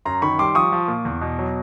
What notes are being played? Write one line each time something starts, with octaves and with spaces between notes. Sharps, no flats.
F#2 A#5 C6
D#3 B5 C#6
G3 C6 D6
F3 C#6 D#6
F3
A#2
E2
B2
F#3